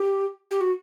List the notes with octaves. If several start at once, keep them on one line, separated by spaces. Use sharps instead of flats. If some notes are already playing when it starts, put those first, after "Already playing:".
Already playing: G4
G4
F#4